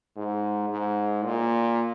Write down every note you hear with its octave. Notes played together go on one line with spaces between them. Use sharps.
G#2
G#2
A#2